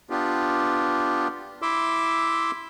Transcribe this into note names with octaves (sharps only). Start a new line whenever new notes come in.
B3 D4 F4 G4
E4 E5 C6 D6 E6